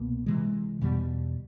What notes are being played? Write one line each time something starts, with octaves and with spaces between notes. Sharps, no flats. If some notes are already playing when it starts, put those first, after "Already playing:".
Already playing: C2 B2 A#3
C3 E3 G#3
E2 B2 G3